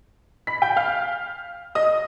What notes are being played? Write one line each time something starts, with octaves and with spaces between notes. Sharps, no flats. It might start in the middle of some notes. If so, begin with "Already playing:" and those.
B5 B6
G5 G6
F5 F6
D#5 D#6